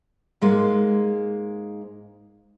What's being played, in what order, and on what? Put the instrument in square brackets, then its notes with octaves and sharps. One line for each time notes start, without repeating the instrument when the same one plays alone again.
[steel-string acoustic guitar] G#2 G#3 A#3